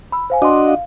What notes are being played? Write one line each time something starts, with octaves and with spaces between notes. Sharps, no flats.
B5 E6
C5 F5 G#5
D4 F#4 D#5 C6 D6
F5